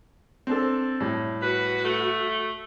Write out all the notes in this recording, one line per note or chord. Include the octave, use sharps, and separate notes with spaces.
C4 D4 A4
A2 G3
F#4 B4
A3